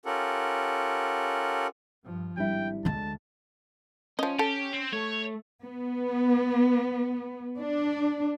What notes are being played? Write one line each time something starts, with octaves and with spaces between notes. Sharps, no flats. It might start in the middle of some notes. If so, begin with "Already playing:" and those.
C#4 F4 G4 A4 A#4 F#5
G2 F3
G#1 G3 D4 E4 G5
D2 D3 G#3 A5
F3 C#4 D#5
G4 A4
C4
A3 C#5
B3
D4